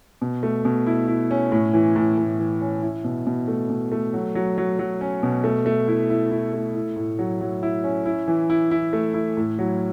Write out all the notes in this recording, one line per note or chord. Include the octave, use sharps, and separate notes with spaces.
B2
A3
B2
E4
E4
C#4
A2
E3
A2
A2
E3
C#4
E4
B2
B2
A3
B2
A3
F#3
F#3
F#3
F#3
C#4
B2
A3
A3
E4
E4
E4
A3
E4
A2
F#3
F#3
E4
C#4
E4
E3
E4
E4
A3
E4
A2
F#3